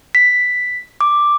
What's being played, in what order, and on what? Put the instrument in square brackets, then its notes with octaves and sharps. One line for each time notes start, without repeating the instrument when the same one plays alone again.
[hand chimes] B6
D6